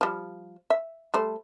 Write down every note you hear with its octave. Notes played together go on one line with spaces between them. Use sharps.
F3 G3
E5
G3 A3 C5